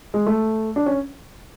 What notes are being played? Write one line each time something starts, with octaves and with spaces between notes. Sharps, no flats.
G#3
A3
D4
C#4